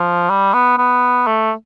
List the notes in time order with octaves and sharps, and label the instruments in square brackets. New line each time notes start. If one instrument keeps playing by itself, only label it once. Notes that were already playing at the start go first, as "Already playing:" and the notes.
Already playing: [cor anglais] F3
G3
B3
B3
A3